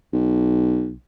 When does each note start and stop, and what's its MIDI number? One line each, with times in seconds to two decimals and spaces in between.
0.13 0.94 35